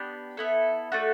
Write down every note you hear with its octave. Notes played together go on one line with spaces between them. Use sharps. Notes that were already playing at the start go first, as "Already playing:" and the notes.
Already playing: B3 D4 G4
B3 E4 A4
A3 D4 F#4 A4